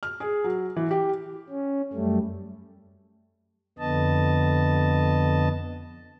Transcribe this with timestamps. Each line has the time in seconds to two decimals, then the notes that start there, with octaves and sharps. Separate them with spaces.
0.03 F6
0.20 G#4
0.44 F#3
0.76 E3
0.91 G4
1.50 C#4
1.93 F#2 G3 A3
3.79 F2 D3 B3 D#5 A5